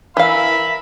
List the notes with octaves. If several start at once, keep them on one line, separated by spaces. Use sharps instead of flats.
E3 A#4 E5 F5 B5